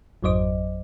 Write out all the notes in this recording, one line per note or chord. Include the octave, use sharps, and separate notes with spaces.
G#1 F2 F#3 C5 D#5 D6